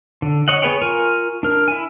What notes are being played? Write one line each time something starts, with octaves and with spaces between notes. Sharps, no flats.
D3
C#5 D#5 F#5
B3 G#4 B4 C#5 G5
F4 A#4 G#5 C#6
D4 A#4
E4 G#5